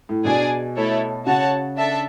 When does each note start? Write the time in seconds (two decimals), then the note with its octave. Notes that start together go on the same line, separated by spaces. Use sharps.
0.09 A2
0.25 B2 D4 G#4 D5 G#5
0.76 A3 E4 A4 C#5
1.26 C#3 F#4 C#5 F#5 A5
1.77 D4 A4 E5 A5